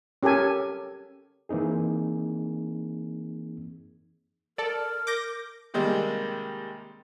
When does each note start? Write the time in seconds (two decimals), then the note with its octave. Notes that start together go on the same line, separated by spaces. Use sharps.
0.23 C#4 G4 A4 A#4 G#5
1.49 E3 A#3 C4 D#4 G#4
4.58 A4 A#4 D5
5.07 D6 G6 A#6
5.74 C3 D#3 G3 G#3 A#3